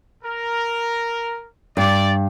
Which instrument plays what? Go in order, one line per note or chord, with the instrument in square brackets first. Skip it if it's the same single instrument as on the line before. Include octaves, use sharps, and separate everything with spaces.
[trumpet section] A#4
[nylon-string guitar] G2 [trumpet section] D5